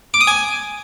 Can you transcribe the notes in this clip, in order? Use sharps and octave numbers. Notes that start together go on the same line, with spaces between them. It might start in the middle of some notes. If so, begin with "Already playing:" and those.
D6
D#6
G#5